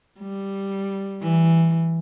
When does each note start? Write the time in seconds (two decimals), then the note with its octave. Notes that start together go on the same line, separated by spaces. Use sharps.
0.21 G3
1.22 E3